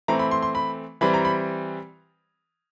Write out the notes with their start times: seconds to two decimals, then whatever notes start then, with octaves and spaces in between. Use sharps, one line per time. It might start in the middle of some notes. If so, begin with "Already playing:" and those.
0.08 E3 A3 C4 A#5
0.19 B5
0.31 C6
0.42 C6
0.55 B5
1.01 E3 G3 C4 B5
1.14 A#5
1.25 B5